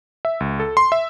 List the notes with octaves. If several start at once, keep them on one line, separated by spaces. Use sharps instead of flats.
E5
C#2
A4
C6
E5